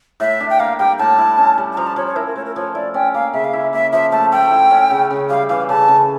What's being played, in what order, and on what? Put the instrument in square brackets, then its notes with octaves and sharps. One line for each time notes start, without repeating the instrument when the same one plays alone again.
[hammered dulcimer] A2 [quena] E5
[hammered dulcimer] D4
[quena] G5
[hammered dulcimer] A#3 [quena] F5
[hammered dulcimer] G3 [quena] G5
[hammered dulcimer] A2 [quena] A5
[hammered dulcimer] E4
C#4
G3
[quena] A5
[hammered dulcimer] F3 [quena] A#5
[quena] A5
[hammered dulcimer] F3 [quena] C#5
[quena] C#5
[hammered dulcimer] E4 [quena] A#4
[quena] A#4
[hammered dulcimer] A3 [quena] C#5
[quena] A#4
[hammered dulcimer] F3 [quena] C#5
[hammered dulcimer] E4 [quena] D5
[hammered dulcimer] C#4 [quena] G5
[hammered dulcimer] A#3 [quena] F5
[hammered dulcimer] C#3 [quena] E5
[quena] F5
[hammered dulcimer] E4 [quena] E5
[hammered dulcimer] A#3 [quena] E5
[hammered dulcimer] F3 [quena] E5
[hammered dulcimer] A3 [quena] A5
[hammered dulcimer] A3 [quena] G5
[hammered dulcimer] E4
C#4
C#3
C#3
[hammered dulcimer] G3 [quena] F5
[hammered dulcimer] E3 [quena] F5
[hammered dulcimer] C#3 [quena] A5
[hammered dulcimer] C#3